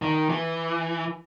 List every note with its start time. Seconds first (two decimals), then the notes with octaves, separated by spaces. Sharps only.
0.02 D#3
0.29 E3